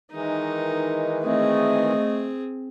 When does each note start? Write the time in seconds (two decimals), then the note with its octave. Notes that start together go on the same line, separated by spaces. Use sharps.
0.12 D#3 E3 G#3 D#4
1.23 A3 C4 G#4 D#5